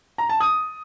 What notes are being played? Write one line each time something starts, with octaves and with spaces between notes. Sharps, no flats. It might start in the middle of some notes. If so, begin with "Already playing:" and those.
A#5
A5
D#6